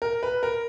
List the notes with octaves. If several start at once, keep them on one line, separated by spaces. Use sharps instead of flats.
A#4
B4
A#4